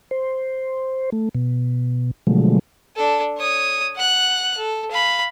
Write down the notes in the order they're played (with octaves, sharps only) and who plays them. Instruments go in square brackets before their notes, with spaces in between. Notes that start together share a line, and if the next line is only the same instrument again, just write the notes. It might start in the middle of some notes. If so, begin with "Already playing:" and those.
[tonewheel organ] C5
A3
B2
B2 D3 F3 F#3 G#3 A3
[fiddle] D4 A4
C#5 D#6
F#5 F#6
A4
F5 B5